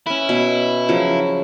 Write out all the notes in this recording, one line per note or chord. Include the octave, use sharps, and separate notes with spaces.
C#4 E4 B4
B2
C#3 F3 F#3